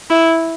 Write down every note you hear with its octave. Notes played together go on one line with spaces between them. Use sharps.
E4